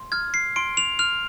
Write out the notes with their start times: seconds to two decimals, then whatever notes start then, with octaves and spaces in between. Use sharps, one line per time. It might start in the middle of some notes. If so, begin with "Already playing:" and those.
Already playing: C6
0.12 F6 G#6
0.34 C7
0.56 C6 D7
0.77 F7
0.99 F6 F7